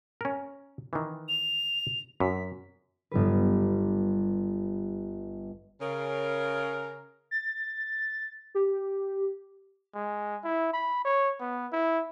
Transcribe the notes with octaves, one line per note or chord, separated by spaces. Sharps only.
C#4 A#4
D#3 E3
F7
F#2 B6
G1 G3 B4
C#3 A#4
A6
G4
G#3
E4
B5
C#5
B3
E4